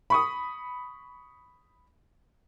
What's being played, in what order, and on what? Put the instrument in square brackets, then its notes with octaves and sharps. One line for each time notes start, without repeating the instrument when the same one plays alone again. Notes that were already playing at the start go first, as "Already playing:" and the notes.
[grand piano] B5 C#6 D#6